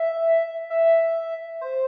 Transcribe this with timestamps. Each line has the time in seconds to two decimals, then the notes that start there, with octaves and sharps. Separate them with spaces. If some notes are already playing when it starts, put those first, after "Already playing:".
Already playing: E5
0.70 E5
1.61 C5